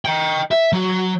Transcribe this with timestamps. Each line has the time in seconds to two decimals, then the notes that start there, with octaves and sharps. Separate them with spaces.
0.05 D#5 G5
0.51 E5
0.73 F#3 F#4